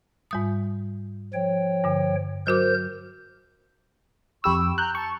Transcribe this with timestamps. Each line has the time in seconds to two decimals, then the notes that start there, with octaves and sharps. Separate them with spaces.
0.31 G#2 G3 D#6
1.34 F3 C#5 G5
1.84 G2 D3
2.47 F#3 F#4 A#4 C5 D6 G6
4.44 F2 G4 B5 C#6 E6
4.59 G5
4.78 G5 A#5 F#6 G6
4.95 A5 C#6